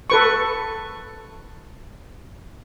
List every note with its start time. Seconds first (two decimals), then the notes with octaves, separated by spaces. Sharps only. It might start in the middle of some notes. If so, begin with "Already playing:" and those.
0.10 A4 B4 C#6